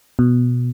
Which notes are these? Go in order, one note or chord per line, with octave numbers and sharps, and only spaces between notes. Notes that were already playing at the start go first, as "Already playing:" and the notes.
B2